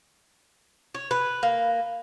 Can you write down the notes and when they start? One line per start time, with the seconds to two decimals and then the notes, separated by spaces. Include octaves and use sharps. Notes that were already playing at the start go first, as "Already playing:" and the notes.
0.95 C#5
1.11 B4
1.43 A#3